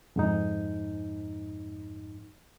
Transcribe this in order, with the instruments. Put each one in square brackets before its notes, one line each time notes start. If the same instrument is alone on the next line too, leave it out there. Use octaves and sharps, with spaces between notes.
[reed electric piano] F2 G#2 D#4